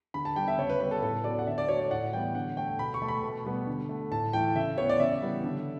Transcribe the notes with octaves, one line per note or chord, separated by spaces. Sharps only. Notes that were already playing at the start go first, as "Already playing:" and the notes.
D3 B5
A5
G3 B3 G5
E5
C#3 C#5
B4
G3 B3 B4
A4
A2 A4
F#3 B3 D5
F#5
D3 E5
D5
F#3 A3 C#5
D5
A2 F#5
E3 G3 B3 G5
D3 F#5
A3 G5
B2 B5
C#6
A3
B5
B2
G3 B3
D3
A3
A2 A5
E3 A3 G5
C#3 E5
E3 B3 C#5
D5
C#3 E5
E3 G3 B3
D3